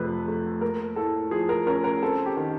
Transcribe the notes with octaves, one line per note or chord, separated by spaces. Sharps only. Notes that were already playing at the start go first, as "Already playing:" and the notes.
Already playing: F2 C3 A3 B4
A3
A#3 A#4
A2 A4
F3 G#4
A#4
C#4 A#4
A#4
C4 A4
G4
D#3